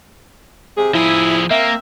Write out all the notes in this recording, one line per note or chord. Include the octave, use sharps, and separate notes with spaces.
C3 G#4
F3 E4 G#4
A#3 C4 A#4 E5